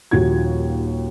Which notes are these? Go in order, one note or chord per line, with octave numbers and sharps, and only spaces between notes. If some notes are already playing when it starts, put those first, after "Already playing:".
D#1 D#2 F3 F#4 G#6